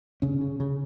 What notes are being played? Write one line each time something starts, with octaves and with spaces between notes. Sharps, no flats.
C#3 C#4
C#3
C#3